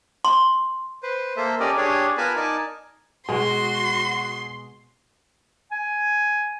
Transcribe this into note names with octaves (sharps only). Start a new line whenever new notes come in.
C6
B4 C5
A#3 A4 C5 E5
C#4 G4 A4 A#4 D5 D#5
D4 G4 G#4 C#5
B3 F4 A#4 G#5 A5 B5
D#4 A#4 D5 G#5 A5
B2 G#3 F#4 G#4 C6
G#5